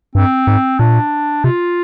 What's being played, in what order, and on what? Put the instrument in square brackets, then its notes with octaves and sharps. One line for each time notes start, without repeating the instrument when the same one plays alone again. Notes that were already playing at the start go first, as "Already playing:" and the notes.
[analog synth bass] G2 [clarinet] C4
[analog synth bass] G#2
[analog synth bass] A#2 [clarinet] D4
[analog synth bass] C3 [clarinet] F4